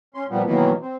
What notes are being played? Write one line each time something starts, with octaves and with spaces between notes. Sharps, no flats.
C#4 C6
A#2 F3 G3 B3
B2 D#3 E3 F#3 A#3 B3
C4